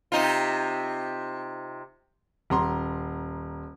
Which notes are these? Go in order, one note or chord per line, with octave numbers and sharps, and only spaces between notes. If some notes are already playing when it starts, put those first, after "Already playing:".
C3 D#4 F4
D#1 A#5 C6